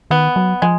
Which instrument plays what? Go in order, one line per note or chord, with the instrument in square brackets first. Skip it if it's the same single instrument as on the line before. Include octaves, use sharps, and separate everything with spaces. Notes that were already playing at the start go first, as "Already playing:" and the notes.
[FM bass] D#3 [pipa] B3
[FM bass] F#3
[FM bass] F3 [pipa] G#3